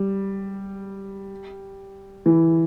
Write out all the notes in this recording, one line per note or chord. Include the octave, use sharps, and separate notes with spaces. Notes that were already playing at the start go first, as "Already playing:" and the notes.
Already playing: G3
E3